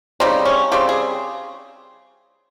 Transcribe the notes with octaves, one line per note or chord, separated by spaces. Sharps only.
C#3 G3 C4 D#4
C#4
C#3 G3 C4 G4
G#4